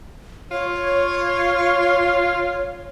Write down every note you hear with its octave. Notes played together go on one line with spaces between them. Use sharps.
F4 C#5